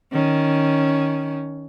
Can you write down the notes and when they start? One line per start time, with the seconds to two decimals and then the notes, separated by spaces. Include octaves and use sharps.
0.12 D#3 C#4